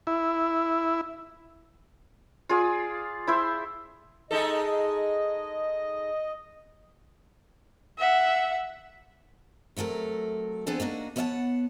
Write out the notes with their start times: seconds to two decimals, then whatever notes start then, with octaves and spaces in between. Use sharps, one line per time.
0.07 E4
2.49 F4 G#4 D5
3.27 E4 C5 E5
4.31 G#3 D#4 A4 D#5
7.98 E5 F#5
9.76 C3 F#3 A3 A4 A#4
10.67 B3 C4 D4 G#4 A4 C5
10.80 A#3 D4 D#4 F#4
11.16 B3 B4 C#5 E5 F#5 A5